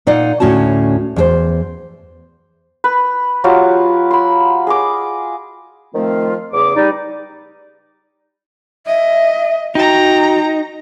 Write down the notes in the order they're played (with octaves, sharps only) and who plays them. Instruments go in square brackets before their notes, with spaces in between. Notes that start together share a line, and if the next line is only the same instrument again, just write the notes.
[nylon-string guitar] A#2 D#4 D5 F5 F#5
D2 A2 C#4 F#4 A5
E2 G#4 C5
[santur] B4
F#3 F4 G4
B5 C6
G#4 D#5 D6
[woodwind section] D#3 F3 A3 C4 F4
E2 C#3 G#4 D6
G3 D#4 D5
[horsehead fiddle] D#5 [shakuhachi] E5
[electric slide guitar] D#4 [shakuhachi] F#4 [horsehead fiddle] G5 A#5